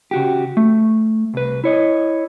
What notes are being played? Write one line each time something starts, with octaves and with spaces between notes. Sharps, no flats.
C#3 F#4 G4
A3
C2 B4
E4 C#5 D#5